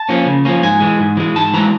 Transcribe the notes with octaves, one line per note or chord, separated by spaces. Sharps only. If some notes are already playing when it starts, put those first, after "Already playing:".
Already playing: A5
F3 A#3 C#4
C#3
F3 A#3 C#4
G#2 G#5
E3 G#3
G#2
E3 G#3
G#2 A5
E3 G#3 A#5